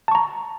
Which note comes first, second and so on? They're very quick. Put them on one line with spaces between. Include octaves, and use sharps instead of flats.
A5 C#6 A#5